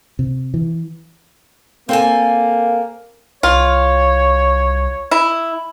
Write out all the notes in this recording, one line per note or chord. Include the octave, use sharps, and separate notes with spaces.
C3
E3
A#3 C4 A4 G#5
C2 F4 C#5
E4